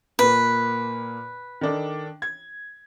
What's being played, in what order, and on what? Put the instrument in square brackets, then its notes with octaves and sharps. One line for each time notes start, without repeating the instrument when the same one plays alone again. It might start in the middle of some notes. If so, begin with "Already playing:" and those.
[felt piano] A#2 A#3 [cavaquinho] B4
[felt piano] D#3 D4 A4
G#6